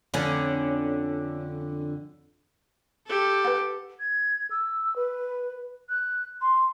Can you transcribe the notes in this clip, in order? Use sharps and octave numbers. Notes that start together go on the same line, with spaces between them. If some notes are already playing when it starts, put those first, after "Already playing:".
F2 D3 C#4
G4 A4
B4 F#5
G#6
E6
B4
F#6
C6